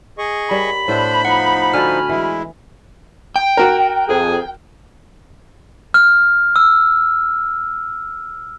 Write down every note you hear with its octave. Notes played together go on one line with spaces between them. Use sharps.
G#4 D#5 C#6
G3 A#4 C#5 B5
A2 B3 D4 C5 E5
F3 D#4 F#5
D3 F#4 A4 G#5 F6
E3 G#3 E4
G5
F#4 A#4
F2 G#4
F6
E6